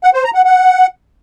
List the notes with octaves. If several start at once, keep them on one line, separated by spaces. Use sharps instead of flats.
F#5
C5
A#5
F#5
F#5